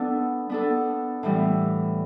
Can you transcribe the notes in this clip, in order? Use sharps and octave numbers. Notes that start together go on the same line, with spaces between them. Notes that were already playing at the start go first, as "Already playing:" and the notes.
Already playing: B3 D4 A4
B3 D4 A4
A2 E3 G3 B3